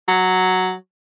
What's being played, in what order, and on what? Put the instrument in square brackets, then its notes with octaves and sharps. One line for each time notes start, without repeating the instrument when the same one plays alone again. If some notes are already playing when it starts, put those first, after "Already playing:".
[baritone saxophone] F#3